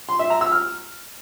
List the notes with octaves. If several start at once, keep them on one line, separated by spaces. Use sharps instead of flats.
C6
E5
A#5
E6
F6